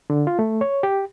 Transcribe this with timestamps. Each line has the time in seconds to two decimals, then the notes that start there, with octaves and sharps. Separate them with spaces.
0.10 D3
0.27 F4
0.39 A3
0.61 C#5
0.83 G4